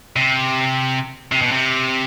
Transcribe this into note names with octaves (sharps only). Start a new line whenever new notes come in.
C3
C3
B2
C3